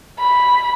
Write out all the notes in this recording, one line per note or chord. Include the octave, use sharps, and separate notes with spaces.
B5